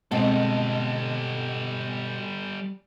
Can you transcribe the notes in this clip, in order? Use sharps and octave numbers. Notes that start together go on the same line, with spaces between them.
B2 G3 G#3 C4 A4